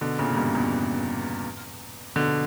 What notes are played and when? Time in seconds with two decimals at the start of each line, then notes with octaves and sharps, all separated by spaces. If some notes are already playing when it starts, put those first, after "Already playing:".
0.01 B2 D3
0.19 A#2 C#3
0.32 A#2
0.37 G2 B2
0.55 E2 G2
2.16 B2 D3